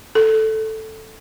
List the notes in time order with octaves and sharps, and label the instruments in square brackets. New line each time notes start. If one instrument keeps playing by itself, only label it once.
[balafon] A4